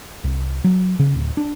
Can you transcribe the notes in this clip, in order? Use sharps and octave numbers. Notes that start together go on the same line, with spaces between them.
C2
F#3
C#3
D1
D4